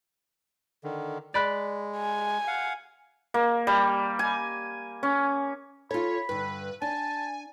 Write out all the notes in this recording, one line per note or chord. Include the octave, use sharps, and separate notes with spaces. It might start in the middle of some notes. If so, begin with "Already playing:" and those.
D3 D#3
G#3 D5 B5 F#6
G#5
F5 F#5
A#3
G3
G#5
C#4
F4 A4 C#5 B5
G2 D3 B4
D4 G#5 A5